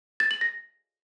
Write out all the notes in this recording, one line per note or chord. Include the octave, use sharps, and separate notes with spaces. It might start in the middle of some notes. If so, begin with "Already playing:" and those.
A6
F#7
A#6